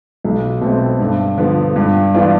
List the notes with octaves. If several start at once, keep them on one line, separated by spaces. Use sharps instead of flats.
B1
B2 A3 C4
G2
D3 F3 B3
G2
E3 B3 D4 F4